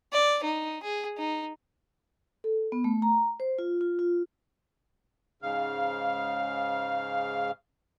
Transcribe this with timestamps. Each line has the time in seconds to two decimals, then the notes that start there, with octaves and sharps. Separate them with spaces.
0.13 D5
0.44 D#4
0.83 G#4
1.18 D#4
2.44 A4
2.72 B3
2.84 A3
3.02 A#5
3.40 C5
3.59 F4
3.81 F4
3.99 F4
5.42 G#2 C#3 F5